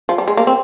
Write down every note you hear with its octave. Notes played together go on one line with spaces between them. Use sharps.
F3
G3
G#3
A#3
C4